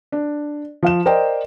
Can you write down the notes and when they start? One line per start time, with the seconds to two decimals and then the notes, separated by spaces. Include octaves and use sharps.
0.12 D4
0.83 F3 F5 E7
1.06 A#4 C5 D5 D#5 G5